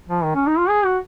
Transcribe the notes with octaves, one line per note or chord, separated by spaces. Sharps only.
F3
D#3
C#4
D#4
F4
G#4
F#4